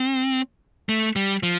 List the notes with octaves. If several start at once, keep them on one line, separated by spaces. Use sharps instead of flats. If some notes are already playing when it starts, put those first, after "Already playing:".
Already playing: C4
A3
G3
F3